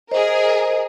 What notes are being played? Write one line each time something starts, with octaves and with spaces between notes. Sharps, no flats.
G#4 A#4 C5 D#5